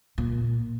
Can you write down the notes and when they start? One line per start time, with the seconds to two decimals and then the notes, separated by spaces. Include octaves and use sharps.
0.18 A#2